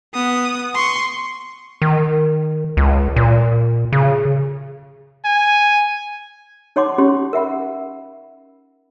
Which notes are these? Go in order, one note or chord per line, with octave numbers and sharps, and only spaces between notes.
B3 D#6
C6 C#6
D#3
C#2
A#2
C#3
G#5
D#4 C#5 F#5 C6 D6
C#4 E4 F4 G4 C6
A#4 E5 F#5 B5